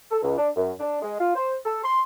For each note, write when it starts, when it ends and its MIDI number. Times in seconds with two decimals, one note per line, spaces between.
0.11 0.18 69
0.22 0.33 37
0.38 0.48 62
0.55 0.71 42
0.80 0.98 62
1.02 1.18 56
1.20 1.33 65
1.35 1.55 72
1.65 1.80 69
1.84 2.02 84